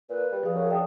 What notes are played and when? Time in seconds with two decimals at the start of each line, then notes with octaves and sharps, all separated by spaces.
0.10 A#2 B4
0.32 G3
0.43 F3 G#4 F5
0.55 F#2
0.71 D4 G5 D#6